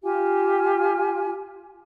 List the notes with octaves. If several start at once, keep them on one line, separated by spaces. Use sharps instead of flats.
F4 G4 F5 G#5